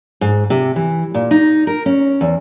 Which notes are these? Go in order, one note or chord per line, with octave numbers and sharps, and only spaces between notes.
G#2
C3
E3
A#2
D#4
A#4
C#4
E2